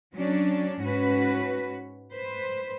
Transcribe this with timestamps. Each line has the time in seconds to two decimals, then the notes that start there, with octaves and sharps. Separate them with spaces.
0.14 F#3 C#4 D4
0.82 G#2 C#4 F#4 B4
2.13 B4 C5